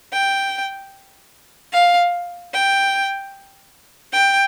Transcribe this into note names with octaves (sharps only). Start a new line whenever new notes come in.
G5
F5
G5
G5